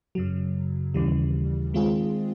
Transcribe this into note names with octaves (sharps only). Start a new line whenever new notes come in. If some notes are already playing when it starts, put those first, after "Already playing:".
F#2 C#3 F#3
D#2 C#3 E3 G3
D#3 G#3 C4 F4 G#4